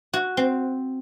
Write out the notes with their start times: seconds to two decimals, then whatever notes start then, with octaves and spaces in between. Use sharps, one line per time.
0.13 F#4
0.37 C4